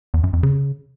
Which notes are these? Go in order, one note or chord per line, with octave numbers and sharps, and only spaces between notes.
E2
F#2
F2
C#3